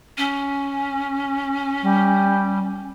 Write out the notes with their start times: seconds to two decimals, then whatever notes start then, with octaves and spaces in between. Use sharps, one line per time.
0.18 C#4
1.82 G3